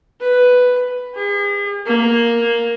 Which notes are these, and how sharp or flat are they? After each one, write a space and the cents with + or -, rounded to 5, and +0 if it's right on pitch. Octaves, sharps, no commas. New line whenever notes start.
B4 +5
G#4 -45
A#3 +5